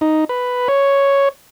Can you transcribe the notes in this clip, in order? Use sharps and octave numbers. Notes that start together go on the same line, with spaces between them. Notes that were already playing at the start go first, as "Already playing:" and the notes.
D#4
B4
C#5